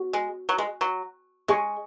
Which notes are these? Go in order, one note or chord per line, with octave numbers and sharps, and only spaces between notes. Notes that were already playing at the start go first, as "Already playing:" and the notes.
Already playing: F#4
G#3
F#3
G#3
F#3
G#3 G#4 D#5 G#5 C#6